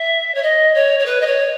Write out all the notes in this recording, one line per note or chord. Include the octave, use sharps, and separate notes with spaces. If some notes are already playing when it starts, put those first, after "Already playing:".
Already playing: E5
C#5
D#5
C#5
C#5
B4
D#5
C#5